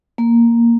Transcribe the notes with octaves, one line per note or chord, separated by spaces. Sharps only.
A#3